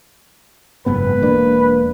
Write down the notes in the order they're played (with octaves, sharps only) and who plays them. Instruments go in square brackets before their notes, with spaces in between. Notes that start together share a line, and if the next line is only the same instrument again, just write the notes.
[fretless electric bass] F#1 G#2 B3 [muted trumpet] B4
[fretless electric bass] E1 A#3 D4